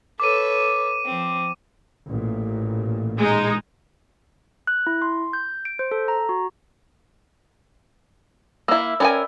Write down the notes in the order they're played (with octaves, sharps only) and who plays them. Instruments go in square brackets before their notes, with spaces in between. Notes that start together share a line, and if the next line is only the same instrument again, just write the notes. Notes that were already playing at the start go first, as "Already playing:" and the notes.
[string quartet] A4 B4 C#5 [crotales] D6 D#7
[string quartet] F3 C4
[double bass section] A1 A#2
[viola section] G#3 D#4
[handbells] F#6
E4
C6
G6
D7
C5
A4
A#5
F#4
[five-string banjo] A#3 E4 [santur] E5 E6
[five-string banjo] C#4 A#4 G#5 [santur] B4 D5 G5